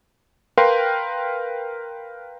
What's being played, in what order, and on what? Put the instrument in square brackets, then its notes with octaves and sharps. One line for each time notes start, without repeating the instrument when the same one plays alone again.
[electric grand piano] A#4 B4 F5 G5 C6